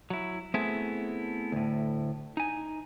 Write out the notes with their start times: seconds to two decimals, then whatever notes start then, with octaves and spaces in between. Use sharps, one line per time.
0.10 F#3 E4
0.54 A3 B3 C4 E4 G#4
1.52 D2 A2
2.37 D#4 G#5